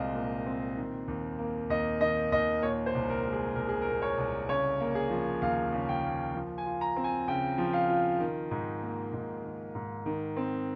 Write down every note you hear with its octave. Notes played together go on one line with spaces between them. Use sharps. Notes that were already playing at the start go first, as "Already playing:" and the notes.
Already playing: C2 A#2 G#3 C4 D#5 F5
A#2
C4
D#3
D#2
A#3
D#2 D#5
D#3 D#5
D#2 D#5
A#2 C#5
C5
C2
A#4
G#3
G#4
C2 A#4
G#4
A#4
A#2
C#5
C2
C#3 C#5
A#3
G#4
F3
D#2 F5
C#3
G5
A#3
F3
G#5
F4
A#5
C4
G#5
C#3 G5
F3
F5
F4
D#3
G#2
A#3
G#2
D#3
G#2
D#3
C4